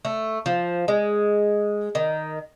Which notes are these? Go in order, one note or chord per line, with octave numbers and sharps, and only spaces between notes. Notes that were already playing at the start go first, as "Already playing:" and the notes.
A3
F3
G#3
D#3